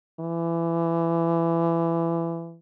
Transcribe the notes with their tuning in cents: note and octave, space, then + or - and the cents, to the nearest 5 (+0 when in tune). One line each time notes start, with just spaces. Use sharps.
E3 +20